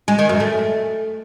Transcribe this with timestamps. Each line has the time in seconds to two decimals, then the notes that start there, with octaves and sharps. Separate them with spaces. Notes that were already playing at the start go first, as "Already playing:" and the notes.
0.08 G#3
0.19 D#3
0.29 F#2
0.40 A3